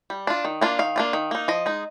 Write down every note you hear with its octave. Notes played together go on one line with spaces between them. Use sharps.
G3
D4 F4
D#3
A#3 D4 F4
D#3 F5
A#3 D4 F4
D#3
A#3 D#4
F3 D#5
G#3 D#4